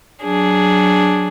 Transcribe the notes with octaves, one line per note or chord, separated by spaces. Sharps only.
F#3 D4 G#4